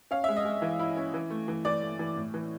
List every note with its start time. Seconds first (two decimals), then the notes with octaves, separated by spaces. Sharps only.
0.11 C#4 F5
0.24 G#3 E5
0.36 D#5
0.45 G#3
0.62 E3
0.79 E4
0.97 C#4
1.14 E3
1.30 A3
1.48 E3
1.65 E3 D5
1.82 A3
1.99 E3
2.17 A2
2.34 E3